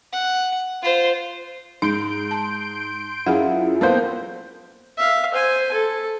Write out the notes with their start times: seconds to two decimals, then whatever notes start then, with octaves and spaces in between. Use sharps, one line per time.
0.12 F#5
0.82 F4 C5
1.82 G#2 D#4 C6 G6 D7
2.31 A5
3.26 F#2 E4 F4 G#4 F#5
3.81 A#3 B3 A4 C5 G5 G6
4.97 E5 F5
5.33 C5 G#5
5.73 A4